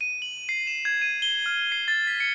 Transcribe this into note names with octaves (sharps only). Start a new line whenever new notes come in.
D#7
F#7
C7
E7
G#6
D#7
G7
F6
C7
A6
B6
C#7